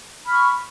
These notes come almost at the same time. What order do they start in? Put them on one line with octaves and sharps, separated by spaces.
B5 F6 C#6